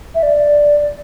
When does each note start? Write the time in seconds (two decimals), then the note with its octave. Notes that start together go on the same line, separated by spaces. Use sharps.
0.15 E5
0.22 D5